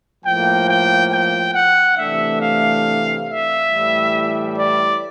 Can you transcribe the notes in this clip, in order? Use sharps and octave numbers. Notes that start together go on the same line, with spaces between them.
A2 F3 A#3 G5
G5
G5
F#5
C3 E3 A3 D4 E5
F5
E5
A2 E3 G3
D5